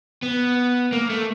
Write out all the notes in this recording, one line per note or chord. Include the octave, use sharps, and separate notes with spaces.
B3
A#3
A3